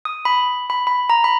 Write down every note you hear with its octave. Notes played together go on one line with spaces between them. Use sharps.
D#6
B5
B5
B5
A#5
B5